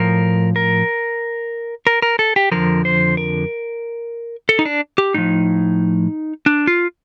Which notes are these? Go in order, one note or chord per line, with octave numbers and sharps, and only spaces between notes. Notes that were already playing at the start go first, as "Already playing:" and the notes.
Already playing: A2 F3 A#4
A#4
A#4
A#4
A4
G4
F2 D3 F3 A#4
C5
A#4
A4
D#4
D4
G4
A2 F3 D#4
D4
F4